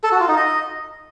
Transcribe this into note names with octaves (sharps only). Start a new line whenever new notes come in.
A4
F#4
F4
D#4
D#5